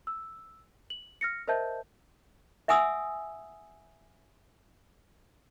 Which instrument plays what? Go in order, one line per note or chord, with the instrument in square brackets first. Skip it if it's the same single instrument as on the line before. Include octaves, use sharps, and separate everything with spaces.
[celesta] E6
F#7
F6 A#6 C#7
A#4 C5 D#5 E5 A5 G6
[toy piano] E5 F#5 G#5 D#6 E6